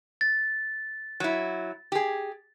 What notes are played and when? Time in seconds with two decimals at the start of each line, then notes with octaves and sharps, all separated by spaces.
0.21 A6
1.20 F#3 E4
1.92 G4 G#4